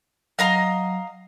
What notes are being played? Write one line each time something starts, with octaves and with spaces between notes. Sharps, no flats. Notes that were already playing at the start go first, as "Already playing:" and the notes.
F#3 D#5 F5 A#5